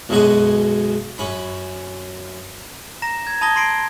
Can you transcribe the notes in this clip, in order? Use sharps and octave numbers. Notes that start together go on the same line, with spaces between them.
B1 F#2 B2 G#3 F#4 G#5
F#2 C#4 B5
A#5 A#6 E7
G#6
A5 B5 D#6 G#6 A#6 G7
A5 C6 A#6 C7 D7